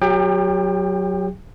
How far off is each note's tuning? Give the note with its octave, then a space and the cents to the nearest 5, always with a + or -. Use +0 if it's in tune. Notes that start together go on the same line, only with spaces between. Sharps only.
F#3 +0 G4 +40 G5 +15